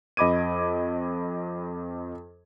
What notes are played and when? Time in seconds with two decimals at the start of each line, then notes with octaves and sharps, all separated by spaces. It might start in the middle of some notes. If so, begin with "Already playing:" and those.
0.17 F2 D#5 B5 D6 G#6 D#7